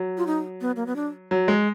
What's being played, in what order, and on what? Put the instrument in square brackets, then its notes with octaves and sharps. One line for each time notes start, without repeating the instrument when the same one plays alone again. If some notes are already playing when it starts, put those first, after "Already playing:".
Already playing: [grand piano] F#3
[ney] F4
D#4
B3
A#3
B3
D4
[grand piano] F#3
G#3